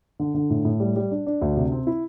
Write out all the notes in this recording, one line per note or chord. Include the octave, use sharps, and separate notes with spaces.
D3
D3
A2
A2
G3
G3
D4
D4
D2
C3
C4
E4